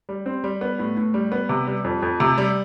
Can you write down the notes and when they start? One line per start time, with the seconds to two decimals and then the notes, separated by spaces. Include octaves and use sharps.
0.09 G3
0.26 C4
0.44 G3
0.61 B3
0.79 A2
0.97 A2
1.14 G3
1.32 B3
1.49 C3
1.67 G3
1.84 F2
2.02 F2
2.20 C3
2.38 G3